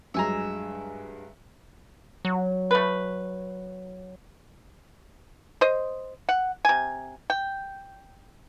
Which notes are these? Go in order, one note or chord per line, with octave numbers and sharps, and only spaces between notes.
G2 F#3 G#3 E5 G#5 A#5
F#3
A3 B4
C5 D#5
F#5
C3 G#5
G5